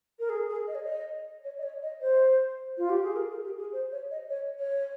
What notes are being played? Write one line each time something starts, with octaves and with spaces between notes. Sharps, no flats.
A#4
G#4
G#4
D#5
C#5
D#5
C#5
D#5
C#5
D#5
C5
F4
G4
G#4
A#4
G#4
G4
G#4
C5
C#5
D#5
C#5
C#5